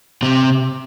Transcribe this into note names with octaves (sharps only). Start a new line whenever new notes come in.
C3 C4